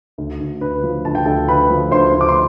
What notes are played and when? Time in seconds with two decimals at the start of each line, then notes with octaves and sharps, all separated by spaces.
0.18 D2
0.40 D2
0.61 D3 B4
0.83 F3
1.05 D2 A5
1.15 G5
1.25 D2 A4 A5
1.48 D3 B4 B5
1.70 F3
1.91 D2 C5 C6
2.14 D2
2.21 D6
2.28 C6